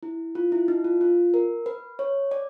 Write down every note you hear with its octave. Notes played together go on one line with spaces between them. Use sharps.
E4
F4
E4
D#4
F4
F4
A#4
B4
C#5
D5